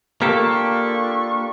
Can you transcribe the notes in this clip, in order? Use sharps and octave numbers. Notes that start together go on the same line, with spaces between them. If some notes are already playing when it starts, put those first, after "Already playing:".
A#3 D4 F4 G4 A4 C#6